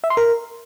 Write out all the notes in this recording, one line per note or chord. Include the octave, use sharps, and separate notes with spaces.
E5
C6
A#4